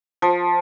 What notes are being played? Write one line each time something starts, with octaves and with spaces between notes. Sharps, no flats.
F3